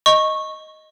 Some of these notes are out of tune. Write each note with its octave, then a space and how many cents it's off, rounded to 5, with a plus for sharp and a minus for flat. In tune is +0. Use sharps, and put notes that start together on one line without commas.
D#5 +0 C#6 -10